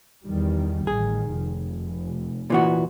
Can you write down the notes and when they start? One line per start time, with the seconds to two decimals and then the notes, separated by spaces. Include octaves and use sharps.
0.24 E2 D#3 G3
0.87 A1 D#3 G#4
1.36 F1
2.50 A#2 E3 F#4